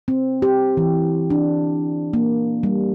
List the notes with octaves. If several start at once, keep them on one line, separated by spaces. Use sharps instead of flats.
C4
G4
E3
D4
A#3
G3